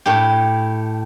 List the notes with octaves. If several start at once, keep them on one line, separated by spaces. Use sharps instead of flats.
A2 G4